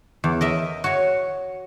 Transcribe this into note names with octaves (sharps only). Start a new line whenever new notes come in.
E2
A#4 D#5 E5
F#4 C#5